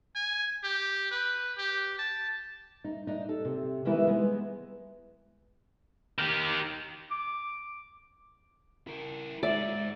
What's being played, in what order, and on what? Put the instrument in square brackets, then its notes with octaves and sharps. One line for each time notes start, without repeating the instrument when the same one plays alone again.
[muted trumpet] G#5
G4
B4
G4
A5
[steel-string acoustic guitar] D#4
D4 D#4
A4
C3
D#3 E3 G#3 B3 E4
G#3 B3
[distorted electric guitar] D#3 G4
[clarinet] D6
[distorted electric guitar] E4 A#4
[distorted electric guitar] G#2 [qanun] D5 [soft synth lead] E5